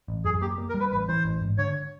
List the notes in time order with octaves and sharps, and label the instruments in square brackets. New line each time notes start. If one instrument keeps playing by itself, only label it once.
[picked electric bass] A1
[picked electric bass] F#2 [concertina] G#4
[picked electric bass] A#3 [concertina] G4
[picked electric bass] A#3
[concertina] A#4
[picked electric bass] G3
[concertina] B4
[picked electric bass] A1 [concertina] B4
[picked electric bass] E3 [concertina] C5
[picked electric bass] A1
G#2
[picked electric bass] D3 [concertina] C#5